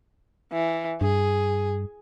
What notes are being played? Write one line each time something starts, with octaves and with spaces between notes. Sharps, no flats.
E3
G2 G#4